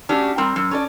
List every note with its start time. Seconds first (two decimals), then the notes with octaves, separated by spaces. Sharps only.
0.09 A3 C#4 D4 F#4 G4 A4
0.38 G3 C4 A#4 A#5
0.56 F#2
0.71 C#4 A4 D5